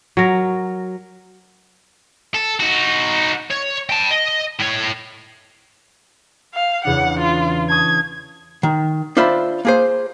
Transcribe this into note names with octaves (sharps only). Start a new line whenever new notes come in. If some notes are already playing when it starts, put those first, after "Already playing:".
F#3 A#4
A4
D#4 F#4
C#5
G5 A5
D#5
A2 C#5
F5
E2 C#3 D4 F#5
F4
A5 C#6 D#6 G#6
D#3
D4 F4 C5 E5 B5
A#3 G#4 C5